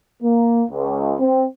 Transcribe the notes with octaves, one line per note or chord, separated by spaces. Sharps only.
A#3
C#2
C4